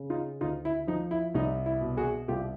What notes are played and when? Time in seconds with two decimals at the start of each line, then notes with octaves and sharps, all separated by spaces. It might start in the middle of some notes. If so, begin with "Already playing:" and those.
Already playing: C#3
0.10 D#4 F4
0.41 D2 D#4 F4
0.65 E4
0.87 F3 D#4
1.11 E4
1.34 C2 D#4
1.66 E4
1.81 B2
1.97 F#4 G#4
2.28 C2 F4 G4